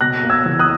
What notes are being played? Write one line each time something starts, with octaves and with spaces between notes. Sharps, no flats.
B2 F#6 A#6
A#3
E6 G#6
E2
D#6 F#6